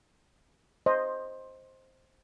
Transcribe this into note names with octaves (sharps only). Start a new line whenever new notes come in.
C5 D#5